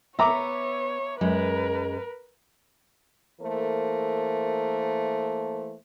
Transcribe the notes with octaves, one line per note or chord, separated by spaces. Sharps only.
B3 C#5 E5 A#5 D6
F#2 G#3 A#4 B4
E3 A3 A#3 A4 A#4 C5